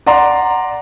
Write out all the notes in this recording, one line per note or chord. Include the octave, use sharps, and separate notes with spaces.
D5 F#5 A#5 C6